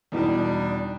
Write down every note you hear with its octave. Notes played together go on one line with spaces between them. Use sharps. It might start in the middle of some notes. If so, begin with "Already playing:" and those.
E2 B2 G3 D4 D#4